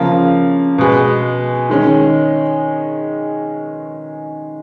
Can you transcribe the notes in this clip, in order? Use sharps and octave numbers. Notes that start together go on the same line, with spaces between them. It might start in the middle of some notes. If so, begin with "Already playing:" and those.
Already playing: C#3 F3 A#3
B2 G#3 B3
D#3 G#3 C#4